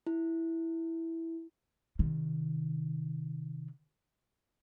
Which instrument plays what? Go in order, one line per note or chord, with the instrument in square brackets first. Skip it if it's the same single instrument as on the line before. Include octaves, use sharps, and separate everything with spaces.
[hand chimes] E4
[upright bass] C3 D#3